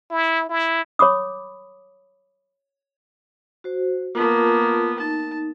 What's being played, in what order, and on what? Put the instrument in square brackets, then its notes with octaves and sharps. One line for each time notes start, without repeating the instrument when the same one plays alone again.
[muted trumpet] E4
E4
[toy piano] C#5 B5 D6 D#6
[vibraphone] F#4 C5
[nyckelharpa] A#3 B3 [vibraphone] F4 A#4 A5
[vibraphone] D#4 [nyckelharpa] A5